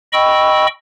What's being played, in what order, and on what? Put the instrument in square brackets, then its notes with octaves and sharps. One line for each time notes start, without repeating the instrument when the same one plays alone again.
[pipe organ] D#5 G5 B5 C#6 E6